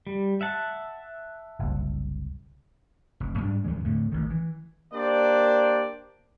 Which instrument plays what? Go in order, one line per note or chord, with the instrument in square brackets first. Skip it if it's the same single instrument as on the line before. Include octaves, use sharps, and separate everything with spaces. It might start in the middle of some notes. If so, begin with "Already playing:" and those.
[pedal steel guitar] G3
E5 F#5 A5
[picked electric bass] F#1 C2
[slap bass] F1
G#2 G3 D4
E2 G2 E3 G#3
A2 D3 A3
A1 D#3
E3
[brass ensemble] A#3 D4 G4 C5 D5